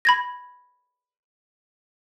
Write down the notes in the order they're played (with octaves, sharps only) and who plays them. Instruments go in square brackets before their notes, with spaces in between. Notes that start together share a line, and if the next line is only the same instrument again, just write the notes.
[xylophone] B5 G#6 A#6